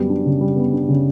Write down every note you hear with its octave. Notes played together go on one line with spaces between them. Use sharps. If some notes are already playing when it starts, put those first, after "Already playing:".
Already playing: F#2 G3 B3
D4
C#3
G3
B3
D4
C#3